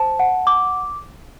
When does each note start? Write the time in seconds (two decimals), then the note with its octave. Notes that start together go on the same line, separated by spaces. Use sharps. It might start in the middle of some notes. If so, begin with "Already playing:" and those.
Already playing: C5 A5
0.19 F#5
0.47 D6